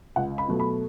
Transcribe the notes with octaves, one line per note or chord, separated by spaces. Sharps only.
C#2 F#5
B5
B2 F#3 A3
B5